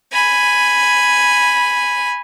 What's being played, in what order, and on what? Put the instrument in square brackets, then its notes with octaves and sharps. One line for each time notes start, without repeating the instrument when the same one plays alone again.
[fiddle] G#5 B5